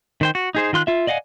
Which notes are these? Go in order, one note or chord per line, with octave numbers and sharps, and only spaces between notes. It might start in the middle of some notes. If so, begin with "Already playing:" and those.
D#3 C5 G5
F#4
D#4 G#4 C5
D#3 F4 C6 F#6
F4 E5
D5 D#5 F5 F#5 G#5